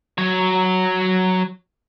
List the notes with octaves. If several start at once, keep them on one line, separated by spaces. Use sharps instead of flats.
F#3 C#5